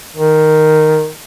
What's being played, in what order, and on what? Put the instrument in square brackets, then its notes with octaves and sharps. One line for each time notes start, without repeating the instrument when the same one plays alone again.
[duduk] D#3